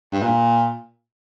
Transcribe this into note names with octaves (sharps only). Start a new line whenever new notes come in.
G2
A#2